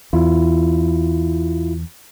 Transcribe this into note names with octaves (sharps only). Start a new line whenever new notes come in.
E2 E4 F4